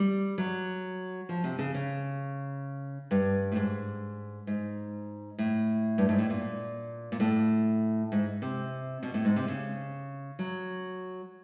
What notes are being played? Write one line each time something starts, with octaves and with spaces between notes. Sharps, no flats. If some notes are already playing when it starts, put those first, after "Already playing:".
Already playing: G3
F#3
F3
C3
C#3
C#3
G2
A2
G#2
G#2
A2
G2
G#2
A2
A#2
A#2
A2
G#2
C3
B2
A2
G#2
C3
C#3
F#3